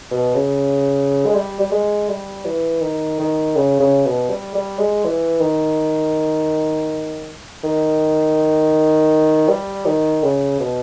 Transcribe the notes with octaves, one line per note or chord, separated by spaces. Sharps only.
B2
C#3
G#3
G3
G3
G#3
G3
E3
D#3
D#3
C#3
C#3
B2
G3
G3
G#3
E3
D#3
D#3
G3
D#3
C#3
B2